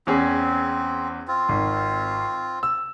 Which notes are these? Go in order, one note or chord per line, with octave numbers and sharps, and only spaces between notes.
E2 C4 C#4 G#4
C4 F4
G#1
E6